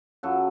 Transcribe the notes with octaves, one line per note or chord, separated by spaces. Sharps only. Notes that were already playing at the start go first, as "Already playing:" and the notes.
F#2 C#3 F#3 F#4 A4